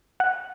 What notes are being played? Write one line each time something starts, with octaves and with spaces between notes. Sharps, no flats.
F#5